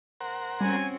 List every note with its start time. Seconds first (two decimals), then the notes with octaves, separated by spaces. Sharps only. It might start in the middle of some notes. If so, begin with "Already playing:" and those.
0.21 A#4 C5 F#5
0.61 G3 C4 C#4 F#4 G#5